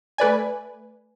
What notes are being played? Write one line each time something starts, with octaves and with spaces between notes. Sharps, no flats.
A3 B4 D5 G#5